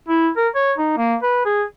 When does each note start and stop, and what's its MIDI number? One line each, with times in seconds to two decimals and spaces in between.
0.09 0.29 64
0.37 0.48 70
0.55 0.72 73
0.78 0.95 63
0.97 1.15 58
1.22 1.43 71
1.46 1.63 68